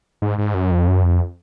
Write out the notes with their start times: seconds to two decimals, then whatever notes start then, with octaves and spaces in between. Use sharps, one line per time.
0.22 G#2
0.38 G#2
0.54 F#2
0.71 F2
0.88 F#2
1.03 F2